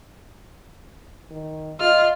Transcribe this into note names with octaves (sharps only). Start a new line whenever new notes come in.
D#3
F4 D#5 F6